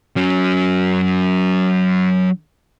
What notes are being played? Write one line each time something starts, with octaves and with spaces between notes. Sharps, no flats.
F#3 C#4